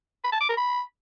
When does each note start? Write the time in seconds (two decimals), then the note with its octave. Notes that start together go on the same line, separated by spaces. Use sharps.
0.24 B5
0.32 A5
0.41 D6
0.49 A#4
0.57 B5